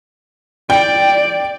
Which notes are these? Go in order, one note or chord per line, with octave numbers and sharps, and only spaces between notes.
D5 G5